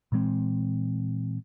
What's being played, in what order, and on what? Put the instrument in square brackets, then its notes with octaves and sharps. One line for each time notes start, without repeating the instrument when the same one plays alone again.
[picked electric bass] A#2 E3 G#3 C4